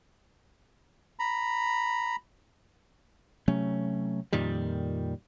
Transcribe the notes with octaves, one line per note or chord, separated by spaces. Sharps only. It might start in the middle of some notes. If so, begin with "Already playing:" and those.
A#5 B5
C3 F#3 A3 C#4
F2 A#2 D#3 G3